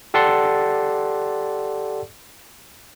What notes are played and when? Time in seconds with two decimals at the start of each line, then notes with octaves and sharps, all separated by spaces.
0.14 G4 A4 D5 F#5 A5 C6